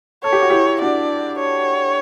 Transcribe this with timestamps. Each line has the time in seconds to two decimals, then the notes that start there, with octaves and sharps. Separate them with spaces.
0.23 A4 C#5
0.32 G4
0.42 F#4
0.50 E4 G4
0.81 D4 F#4 D5
1.39 C#5